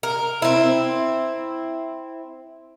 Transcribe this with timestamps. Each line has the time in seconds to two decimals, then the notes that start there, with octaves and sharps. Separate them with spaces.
0.03 A#4
0.42 C4 E4